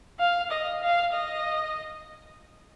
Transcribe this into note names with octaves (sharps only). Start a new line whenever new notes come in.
F5
D#5
F5
D#5